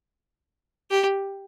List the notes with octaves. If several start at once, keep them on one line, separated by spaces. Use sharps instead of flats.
G4